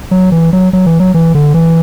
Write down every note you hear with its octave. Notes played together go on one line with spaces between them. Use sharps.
F#3
E3
F#3
F#3
E3
F#3
E3
D3
E3